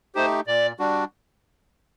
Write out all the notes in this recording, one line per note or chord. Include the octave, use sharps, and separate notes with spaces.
A3 D#4 G4 C5
A#2 D5
G3 D4 F#4